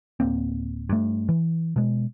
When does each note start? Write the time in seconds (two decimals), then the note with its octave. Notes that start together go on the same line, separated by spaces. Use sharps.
0.20 D1 A#3 C4
0.89 G2 A3
1.29 E3
1.76 B2 G#3